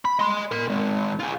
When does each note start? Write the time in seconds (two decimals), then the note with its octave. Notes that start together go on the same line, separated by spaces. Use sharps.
0.05 B5
0.20 D#5 C6
0.52 A#4 C6
0.68 D#3 G#3
1.19 F4 G#4